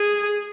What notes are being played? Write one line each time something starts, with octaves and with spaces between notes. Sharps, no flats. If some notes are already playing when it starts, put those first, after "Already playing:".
Already playing: G#4